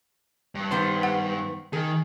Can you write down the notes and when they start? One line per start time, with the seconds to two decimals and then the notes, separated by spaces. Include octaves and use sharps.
0.55 G2
0.71 D#3 B3 C5
1.03 F#5
1.73 D#3 G#4